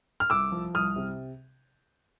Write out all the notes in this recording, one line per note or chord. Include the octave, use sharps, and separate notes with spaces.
F6
C2 D6 E6
F3
C2 D#6 F6
C3